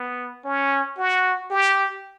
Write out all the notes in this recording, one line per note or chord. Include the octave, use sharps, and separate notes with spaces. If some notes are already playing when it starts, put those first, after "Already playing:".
Already playing: B3
C#4
F#4
G4